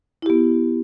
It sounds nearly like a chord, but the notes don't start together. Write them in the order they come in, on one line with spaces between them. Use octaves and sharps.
E4 G4 B3